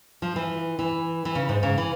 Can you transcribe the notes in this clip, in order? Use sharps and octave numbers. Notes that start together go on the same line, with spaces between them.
F3
E3
E3
E3
C#3
G#2
C#3
E3